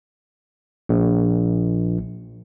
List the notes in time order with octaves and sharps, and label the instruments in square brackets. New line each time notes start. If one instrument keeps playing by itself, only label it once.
[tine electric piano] A#1